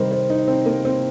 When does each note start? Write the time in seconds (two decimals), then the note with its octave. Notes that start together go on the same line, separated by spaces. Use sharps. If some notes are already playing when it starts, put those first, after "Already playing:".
Already playing: C3 D#3 G3 A#4 C5 D#5
0.11 C5
0.30 D#4
0.48 C4
0.66 A#3
0.85 C4